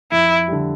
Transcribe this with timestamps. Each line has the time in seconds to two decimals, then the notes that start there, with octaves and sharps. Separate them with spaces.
0.12 F2 E4
0.48 D3 G3